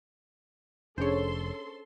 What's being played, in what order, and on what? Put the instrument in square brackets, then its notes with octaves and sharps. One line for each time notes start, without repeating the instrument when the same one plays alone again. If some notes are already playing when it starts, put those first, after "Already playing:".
[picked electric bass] F1 [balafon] C#4 D4 G#4 [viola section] A4 C6 [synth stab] C5 C#5